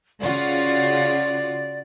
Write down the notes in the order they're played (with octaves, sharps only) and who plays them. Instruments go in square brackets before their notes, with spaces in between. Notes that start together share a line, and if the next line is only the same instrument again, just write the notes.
[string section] C#3 F4 F#4 [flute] D5